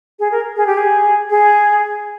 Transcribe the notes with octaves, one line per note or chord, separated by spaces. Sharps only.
G#4
A#4
G#4
G4
G#4
G#4